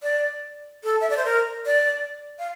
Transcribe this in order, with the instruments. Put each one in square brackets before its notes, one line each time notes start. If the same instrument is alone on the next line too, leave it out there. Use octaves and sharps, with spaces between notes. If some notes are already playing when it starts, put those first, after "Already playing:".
[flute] D5
A4
E5
D5
C5
A#4
D5
F5